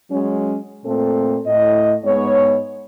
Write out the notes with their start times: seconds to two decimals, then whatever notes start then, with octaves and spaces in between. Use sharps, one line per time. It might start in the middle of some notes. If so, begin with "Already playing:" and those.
0.10 F#3 G#3 C#4
0.85 A#2 A3 C4 A4
1.45 A2 D#5
2.05 G#2 G#3 B3 C#5